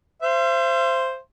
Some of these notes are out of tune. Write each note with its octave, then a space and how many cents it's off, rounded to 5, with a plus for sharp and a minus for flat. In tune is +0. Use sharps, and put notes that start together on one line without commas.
C5 +0 E5 +45